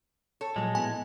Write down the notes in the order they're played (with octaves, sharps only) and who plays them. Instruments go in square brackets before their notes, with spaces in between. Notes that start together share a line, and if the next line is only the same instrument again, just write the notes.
[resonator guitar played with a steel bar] A4 [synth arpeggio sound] C#5
[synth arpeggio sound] A#2 F3 F#3 [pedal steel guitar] G#3
[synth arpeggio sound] A2 B3 E4 [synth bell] G#5